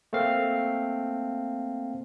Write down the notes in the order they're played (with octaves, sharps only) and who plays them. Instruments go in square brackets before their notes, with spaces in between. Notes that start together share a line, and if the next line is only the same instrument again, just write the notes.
[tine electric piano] A3 A#3 C4 F5